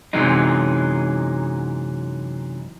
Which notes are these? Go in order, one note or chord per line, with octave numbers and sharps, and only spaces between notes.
F#2 C3 E3 F#3 G#3 D#4